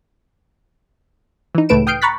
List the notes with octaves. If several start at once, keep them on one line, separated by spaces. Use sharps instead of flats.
E3 D#4
C#2 A2 A3 B4 D7 E7
G5 D#6 F6 G6 C7 D7
A#5 B5 C#6 F#6 A6 B6